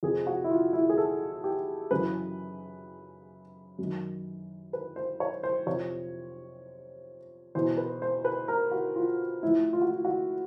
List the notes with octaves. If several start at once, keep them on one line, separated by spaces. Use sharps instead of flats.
F2 C3 F3 G#4
F#4
E4
F4
E4
G#4
A4
G4
F#2 C#3 E3 B4
F#2
D#3
B4
C5
C#5
C5
F2 C3 F3 C#5
E2 B2 C5
B4
C5
B4
A#4
F#4
F4
A2 F3 E4
F4
F#4
F4
F#4